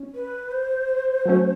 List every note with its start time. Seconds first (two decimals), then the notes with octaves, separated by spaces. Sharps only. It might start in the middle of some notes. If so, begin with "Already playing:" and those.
Already playing: C#4
0.14 B4
0.51 C5
1.26 F#3 A3 C#4